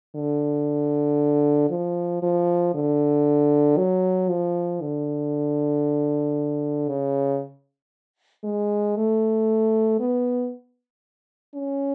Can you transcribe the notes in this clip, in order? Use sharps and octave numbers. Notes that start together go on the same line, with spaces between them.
D3
F3
F3
D3
F#3
F3
D3
C#3
G#3
A3
B3
C#4